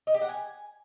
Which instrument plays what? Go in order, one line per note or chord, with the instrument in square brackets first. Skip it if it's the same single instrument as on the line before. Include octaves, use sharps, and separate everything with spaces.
[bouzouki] D#5
G4
F#5
G#5